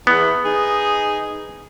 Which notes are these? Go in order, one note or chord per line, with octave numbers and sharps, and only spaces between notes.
E2 B3
D#4 G#4